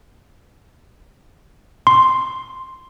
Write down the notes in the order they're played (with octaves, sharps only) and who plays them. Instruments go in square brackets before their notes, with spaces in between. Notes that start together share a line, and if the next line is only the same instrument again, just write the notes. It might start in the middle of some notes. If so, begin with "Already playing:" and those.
[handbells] C6